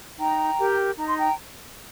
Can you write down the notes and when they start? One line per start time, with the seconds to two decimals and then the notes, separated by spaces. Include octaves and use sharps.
0.19 D#4 G5 A#5
0.59 G4 A#4
0.97 D#4 A#5
1.07 C6
1.16 G5 A#5